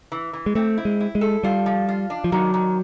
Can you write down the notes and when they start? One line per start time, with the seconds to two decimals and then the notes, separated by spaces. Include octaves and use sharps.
0.12 E3
0.33 E3
0.46 G#3
0.55 A3 C4
0.78 E4
0.85 G#3
1.00 E4
1.15 G#3
1.21 A4
1.43 G3 F4
1.66 F3
1.89 F4
2.10 D4
2.24 F3
2.32 D#3 F#3
2.54 D#3